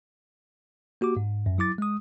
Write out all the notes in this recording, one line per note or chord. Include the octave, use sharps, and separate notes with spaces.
A#3 F#4 G4 D6
G#2
F#2
F#3 E4 D6 A6
G#3 D#6